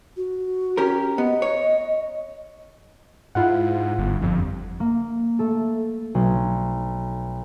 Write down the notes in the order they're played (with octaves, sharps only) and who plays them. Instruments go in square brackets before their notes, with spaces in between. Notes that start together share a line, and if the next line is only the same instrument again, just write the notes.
[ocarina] F#4
[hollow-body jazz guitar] C#4 G4 A#4
[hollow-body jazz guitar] B3 [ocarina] D#5
[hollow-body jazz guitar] C#5
[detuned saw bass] G#2 [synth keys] E4 F4 F#5
[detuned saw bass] G1
[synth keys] G1 [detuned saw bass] F2
[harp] A#3
A3 A4
B1